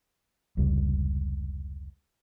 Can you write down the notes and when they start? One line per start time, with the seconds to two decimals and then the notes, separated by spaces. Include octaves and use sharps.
0.57 F1 C#2 G3